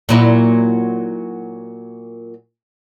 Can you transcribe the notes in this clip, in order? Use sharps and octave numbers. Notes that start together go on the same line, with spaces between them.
A#2 F#3 E4